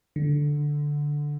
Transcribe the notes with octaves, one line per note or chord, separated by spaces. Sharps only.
D3